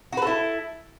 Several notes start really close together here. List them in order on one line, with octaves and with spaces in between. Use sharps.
F#4 B4 A4 E4